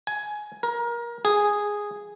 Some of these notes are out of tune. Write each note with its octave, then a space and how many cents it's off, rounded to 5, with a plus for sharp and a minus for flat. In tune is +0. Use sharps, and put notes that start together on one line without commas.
G#5 +15
A#4 +25
G#4 -5